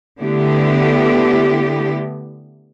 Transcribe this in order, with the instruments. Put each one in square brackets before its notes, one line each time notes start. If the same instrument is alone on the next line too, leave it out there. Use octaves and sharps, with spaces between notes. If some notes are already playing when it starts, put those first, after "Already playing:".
[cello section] D3 A3 B3 E4 G4